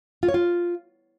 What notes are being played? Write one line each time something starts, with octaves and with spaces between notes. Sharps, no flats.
F4
C#5
F4